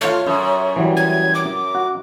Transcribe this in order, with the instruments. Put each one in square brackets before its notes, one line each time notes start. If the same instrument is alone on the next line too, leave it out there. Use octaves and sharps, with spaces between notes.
[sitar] A3 F4 [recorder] C#5
[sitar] F#2
[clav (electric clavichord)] E3 F#3 G3
[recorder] G#6
D6
[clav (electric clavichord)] F#4